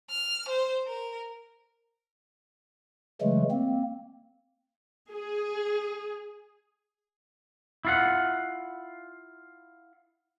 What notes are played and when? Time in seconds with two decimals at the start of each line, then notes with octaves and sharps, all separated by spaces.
0.11 F6
0.49 C5
0.87 A#4
3.21 C#3 E3 F#3 G#3 A3
3.51 A#3 C4
5.12 G#4
7.85 E4 F4 F#5